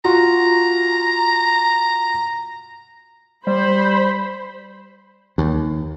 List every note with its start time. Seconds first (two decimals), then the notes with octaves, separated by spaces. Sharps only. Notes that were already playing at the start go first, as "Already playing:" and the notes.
0.04 F4 F#4 A#5
3.47 G3 C5 B5
5.38 D#2